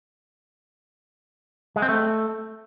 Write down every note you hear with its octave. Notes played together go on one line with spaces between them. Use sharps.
G#3
C4
A3